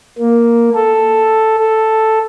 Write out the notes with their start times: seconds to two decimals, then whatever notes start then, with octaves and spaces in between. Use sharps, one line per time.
0.19 A#3
0.75 A4
1.58 A4